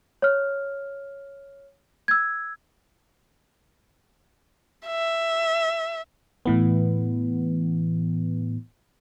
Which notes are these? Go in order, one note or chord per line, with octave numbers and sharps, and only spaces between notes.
C#5 F6
E6 G#6
E5
A2 E3 B3